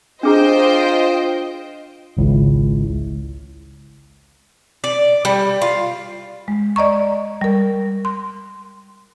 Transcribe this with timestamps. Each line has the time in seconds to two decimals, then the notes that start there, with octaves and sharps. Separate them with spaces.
0.23 D4 F4 G#4 C5 D#5 G5 A#5
2.17 G#1 C#2 E4
4.84 D5
5.25 G3
5.62 F4
6.48 G#3
6.76 D5 D#5 A#5 C#6
7.41 G3 A#4
8.05 C6